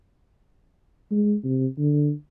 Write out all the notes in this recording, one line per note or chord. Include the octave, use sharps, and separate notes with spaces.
G#3
C3
D3